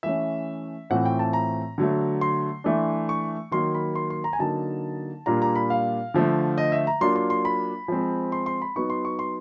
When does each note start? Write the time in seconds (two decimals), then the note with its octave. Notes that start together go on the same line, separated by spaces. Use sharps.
0.03 E3 A3 C#4 E5
0.90 A2 E3 A3 C4 F4 F#5
1.05 G5
1.19 A5
1.33 A#5
1.78 D3 F#3 A3
2.21 C6
2.64 E3 A3 D4
3.09 C#6
3.51 D#3 F#3 A#3 C6
3.75 B5
3.95 C6
4.10 C6
4.24 A#5
4.33 G#5
4.39 D3 F#3 A#3 D#4 A5
5.26 A#2 G3 A#3 D4 F4 A#5
5.42 A#5
5.56 B5
5.70 F5
6.14 D3 F3 A3
6.58 D#5
6.72 E5
6.87 A#5
7.01 F#3 A#3 D4 F4 C6
7.16 C6
7.30 C6
7.45 B5
7.88 F3 G#3 C4
8.32 C6
8.46 C6
8.62 B5
8.76 F#3 B3 D#4 C#6
8.90 C6
9.05 C#6
9.19 C6